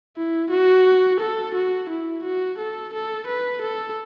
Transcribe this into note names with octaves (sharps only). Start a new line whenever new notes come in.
E4
F#4
A4
F#4
E4
F#4
A4
A4
B4
A4